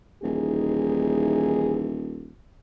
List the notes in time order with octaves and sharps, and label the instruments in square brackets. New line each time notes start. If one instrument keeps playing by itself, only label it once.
[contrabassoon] D#1 [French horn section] E3 D#4 G#4